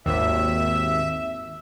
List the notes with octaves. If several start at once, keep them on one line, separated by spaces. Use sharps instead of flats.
G#1 D#2 E5